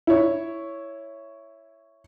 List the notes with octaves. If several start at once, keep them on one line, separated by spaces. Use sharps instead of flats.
E4 C#5